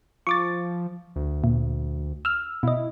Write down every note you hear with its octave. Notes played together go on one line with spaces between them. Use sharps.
F3 C#6 D6 A6
D2
A#2
E6 F6
B2 E4 D#5